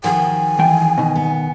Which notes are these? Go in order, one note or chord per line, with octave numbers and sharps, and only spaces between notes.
D#3 F3 F#4 G#5
E3 G5
B2 D#3
B3